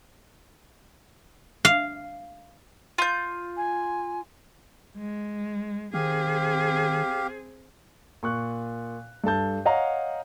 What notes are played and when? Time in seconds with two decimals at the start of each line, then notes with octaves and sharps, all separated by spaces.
1.65 F5
2.98 F4 G6
3.57 G#5
4.97 G#3
5.94 D#3 C4 G4 G#4 F5
8.23 A#2 C#6 F#6
9.24 G2 A4 A5 G6
9.65 C#5 D#5 F5 F#5 A#5